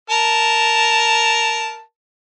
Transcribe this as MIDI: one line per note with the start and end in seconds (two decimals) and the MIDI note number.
0.10 1.81 70
0.10 1.81 81